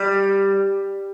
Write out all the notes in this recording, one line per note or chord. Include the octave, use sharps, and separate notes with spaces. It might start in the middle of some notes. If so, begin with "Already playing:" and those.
Already playing: G3